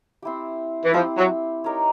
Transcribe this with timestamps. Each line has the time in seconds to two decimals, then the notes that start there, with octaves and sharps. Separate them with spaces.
0.22 C4 E4 G4
0.84 E3
0.94 F3 C4 E4 G4
1.18 F#3
1.64 D#4 G4 A#4 C#5